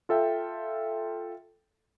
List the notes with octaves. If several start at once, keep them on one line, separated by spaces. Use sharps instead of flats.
F4 A4 E5 G5